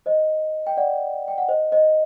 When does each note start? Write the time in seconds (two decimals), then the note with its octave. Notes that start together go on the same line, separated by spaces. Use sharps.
0.06 C5 D#5
0.67 G5
0.77 D5 F#5
1.28 G5
1.38 F#5
1.48 C5 D#5
1.72 C5 D#5